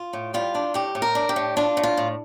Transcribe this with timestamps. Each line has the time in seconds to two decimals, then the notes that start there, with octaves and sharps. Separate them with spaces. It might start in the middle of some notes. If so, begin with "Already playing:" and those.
Already playing: F4
0.13 A2
0.34 G3 F4
0.55 D4
0.74 A2 G4
0.95 A2
1.02 A#4
1.15 D4
1.29 G4
1.36 A2
1.57 D4 F4
1.77 A2
1.83 F4
1.97 A2